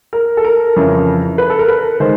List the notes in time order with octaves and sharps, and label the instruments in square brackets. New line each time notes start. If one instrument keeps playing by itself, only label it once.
[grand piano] A#4
A4
A#4
F2 C#3 E3
B4
A4
A#4
B4
D#3 G#3 C5